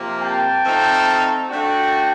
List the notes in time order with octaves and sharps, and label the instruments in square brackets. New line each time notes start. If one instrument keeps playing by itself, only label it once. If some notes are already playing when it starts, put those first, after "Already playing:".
Already playing: [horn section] C3 F3 A#3
[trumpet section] G5 A5
[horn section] F3 A3 C4 D#4
[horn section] A3 D4 F#4 [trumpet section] G5 A5